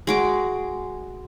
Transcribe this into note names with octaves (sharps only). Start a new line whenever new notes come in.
G#3 F#4 D6